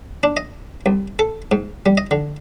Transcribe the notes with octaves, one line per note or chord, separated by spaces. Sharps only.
D4
D#5
C2
A4
G#2
G3
D#5
D3